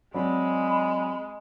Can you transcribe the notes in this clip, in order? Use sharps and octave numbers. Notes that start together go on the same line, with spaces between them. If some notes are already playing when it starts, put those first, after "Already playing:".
F#3 G#3 C4 D5 B5